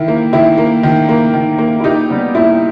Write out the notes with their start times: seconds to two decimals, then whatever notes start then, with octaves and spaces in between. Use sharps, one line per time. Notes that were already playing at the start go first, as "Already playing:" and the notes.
Already playing: D#3 E4
0.08 A#3
0.33 D#3 E4
0.58 A#3
0.83 D#3
1.09 A#3
1.34 D#3
1.58 A#3
1.80 E4
1.83 A#2 D#4 G4
2.09 G3 B3
2.35 A#2 E4